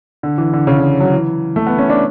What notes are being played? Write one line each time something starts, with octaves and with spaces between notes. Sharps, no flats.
D3
E3
D3
C#3
D3
F#3
E3
A3
B3
C#4
D4